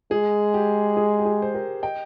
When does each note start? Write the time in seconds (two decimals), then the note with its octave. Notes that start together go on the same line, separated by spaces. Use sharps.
0.11 G#3 G#4
0.54 G4
0.97 G#4
1.19 G4
1.25 G#4
1.42 C5
1.54 G4 A#4
1.82 D#5 G5